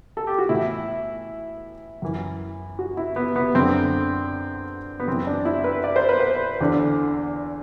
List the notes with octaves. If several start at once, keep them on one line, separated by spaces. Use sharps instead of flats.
A4
G4
F#4
A2 E3 E4
F#2 E3
F#4
E4
B3
B3
F#2 D3 C4
B3
F#2 E3 C4
D4
E4
B4
D5
C5
B4
C5
E2 D3